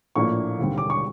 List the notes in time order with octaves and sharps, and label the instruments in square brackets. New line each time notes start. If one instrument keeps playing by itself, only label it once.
[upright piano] A#1 A2 F3 A#3 D4 C#6
E1 D#2 D3 G3 C4
D6
C#6